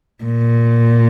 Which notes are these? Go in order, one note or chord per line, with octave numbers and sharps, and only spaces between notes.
A#2